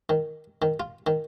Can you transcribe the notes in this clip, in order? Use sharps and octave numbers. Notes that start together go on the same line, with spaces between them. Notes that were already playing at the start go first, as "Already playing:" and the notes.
D#3
D#3
F4
D#3